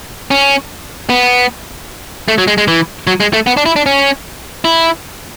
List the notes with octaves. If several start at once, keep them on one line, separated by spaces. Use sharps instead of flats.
C#4
B3
A3
F#3
G#3
G#3
E3
F#3
G#3
A3
B3
D4
E4
D4
C#4
E4